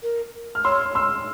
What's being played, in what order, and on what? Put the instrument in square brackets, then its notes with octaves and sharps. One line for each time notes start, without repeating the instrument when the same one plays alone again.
[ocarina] A#4
[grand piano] F6
[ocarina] C#5 [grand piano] C6 E6
[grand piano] C6 E6